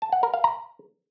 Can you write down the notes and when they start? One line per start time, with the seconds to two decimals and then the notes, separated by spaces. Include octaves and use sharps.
0.02 A5
0.12 F#5
0.23 A#4
0.33 F5
0.44 A#5